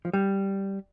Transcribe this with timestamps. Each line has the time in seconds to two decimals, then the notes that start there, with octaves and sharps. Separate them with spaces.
0.05 F3
0.13 G3